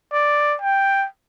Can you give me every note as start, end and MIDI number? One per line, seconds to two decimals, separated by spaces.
0.13 0.56 74
0.62 1.06 79